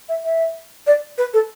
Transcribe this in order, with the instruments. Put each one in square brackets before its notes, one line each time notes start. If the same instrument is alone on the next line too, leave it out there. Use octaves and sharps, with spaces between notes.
[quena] E5
E5
D5
B4
A4